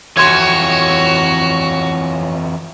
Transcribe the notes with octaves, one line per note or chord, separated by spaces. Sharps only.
F2 E3 F#4 C#5 C6 G#6